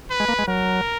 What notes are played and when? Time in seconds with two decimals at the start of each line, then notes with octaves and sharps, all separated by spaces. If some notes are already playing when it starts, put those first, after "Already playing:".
0.11 B4
0.20 G#3
0.29 A#3
0.39 G#3
0.48 F#3 A#4